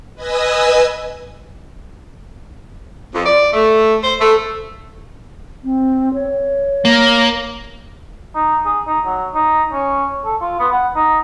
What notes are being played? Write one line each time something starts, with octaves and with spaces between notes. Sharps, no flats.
B4 D#5 G#5 D#6 E6
F2
D5
A3
C5
A3
C4
C#5
A#3
D#4
G#4
D#4
F#3
D#4
C#4
A4
F4
B3
F#5
D#4